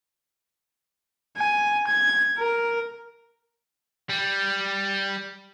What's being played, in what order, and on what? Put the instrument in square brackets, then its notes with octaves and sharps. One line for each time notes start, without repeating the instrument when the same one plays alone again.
[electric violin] G#5
G#6
A#4
[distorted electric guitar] G3